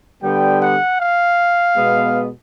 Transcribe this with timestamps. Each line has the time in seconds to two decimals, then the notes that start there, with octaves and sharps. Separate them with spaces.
0.23 D3 G3 B3 G5
0.61 F#5
1.00 F5
1.77 B2 G#3 B3